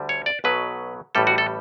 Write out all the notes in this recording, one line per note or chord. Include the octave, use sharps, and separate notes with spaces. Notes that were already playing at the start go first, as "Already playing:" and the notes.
Already playing: D2 D3 G3
C#5
D5
B1 B2 F#3 B4
A1 A2 G3 A4
F#4
A4